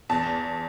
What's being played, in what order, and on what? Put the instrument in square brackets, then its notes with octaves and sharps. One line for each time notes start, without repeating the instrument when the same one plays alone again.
[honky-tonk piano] E2 A5